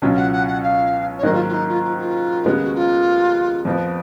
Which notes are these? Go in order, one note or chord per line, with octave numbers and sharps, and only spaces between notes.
C#2 B2 F#3 C#4 F4
F#5
F#5
F#5
F5
C#5
G#2 D#3 F#3 A#3 D#5
F4
F4
D#4
F4
F4
F4
D#2 C#3 G#3 B3
F#4
F4
F2 F3 B3